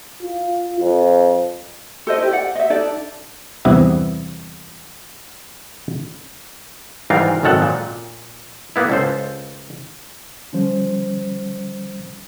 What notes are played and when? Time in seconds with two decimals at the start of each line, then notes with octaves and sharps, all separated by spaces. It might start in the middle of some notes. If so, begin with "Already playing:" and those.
0.22 F4
0.80 F2
2.07 A4 C5 D#5
2.18 E4 G4
2.31 D5 F#5
2.55 D#5 E5
2.70 D4 D#4 A4 D5
3.65 E2 G2 C3 B3 E4
7.10 G#2 E3 G3 F4 A#4 F5
7.43 G#1 F#2 D#3 A4 F#5
7.62 A#2
8.76 A#3 B3 E4
8.90 C#2 A4 C5
10.53 D3 F3 G3 C#4 C5